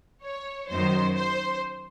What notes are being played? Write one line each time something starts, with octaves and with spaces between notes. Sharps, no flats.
C#5
F#2 D#3 F#3 C5
C5